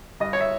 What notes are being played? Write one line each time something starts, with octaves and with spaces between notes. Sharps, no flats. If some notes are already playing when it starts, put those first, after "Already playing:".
G2 D#5
C#5
E5